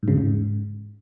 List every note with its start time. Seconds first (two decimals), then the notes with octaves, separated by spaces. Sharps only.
0.03 G#2
0.08 C#3
0.13 E2
0.18 G#2